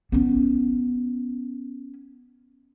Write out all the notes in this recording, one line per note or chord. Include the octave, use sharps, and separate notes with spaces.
B3 C#4